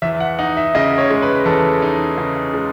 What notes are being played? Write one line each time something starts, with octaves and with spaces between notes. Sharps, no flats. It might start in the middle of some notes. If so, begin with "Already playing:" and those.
E2 E5
F#5
D#4 F#5
E5
C#3 D#5
C#5
G#3
B4
E2 A4
D#4
C#3
G#3